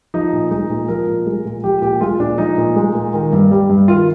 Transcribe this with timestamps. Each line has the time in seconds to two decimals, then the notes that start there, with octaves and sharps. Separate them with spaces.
0.14 F3 D#4
0.33 A#2
0.51 G#3 D#4
0.70 A#2
0.88 F3 A#4
1.07 A#2
1.26 G#3
1.46 A#2
1.63 F3 G4
1.82 A#2 G4
2.01 G#3 F4
2.20 A#2 D4
2.38 F3 D#4
2.58 A#2
2.76 G#3
2.95 A#2
3.14 D#3
3.33 G2
3.51 G3
3.69 G2
3.88 D#3 F4